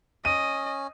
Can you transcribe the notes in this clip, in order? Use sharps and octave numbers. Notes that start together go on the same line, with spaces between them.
C#4 D#5 D#7